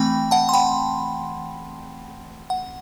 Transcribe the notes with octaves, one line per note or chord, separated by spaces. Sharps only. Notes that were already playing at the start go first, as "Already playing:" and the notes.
Already playing: E3 A3 C4 G5 B5
F#5 A5
C6
G5 B5
F#5